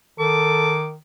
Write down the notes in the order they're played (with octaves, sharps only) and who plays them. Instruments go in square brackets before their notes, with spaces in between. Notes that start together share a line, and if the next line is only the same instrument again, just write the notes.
[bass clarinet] D#3 [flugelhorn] A4 [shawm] D6